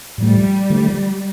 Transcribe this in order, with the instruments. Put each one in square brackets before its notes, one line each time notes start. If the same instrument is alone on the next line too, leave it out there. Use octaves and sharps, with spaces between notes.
[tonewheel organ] A2 F3 A3 [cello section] G3
[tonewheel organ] D3 F3 A3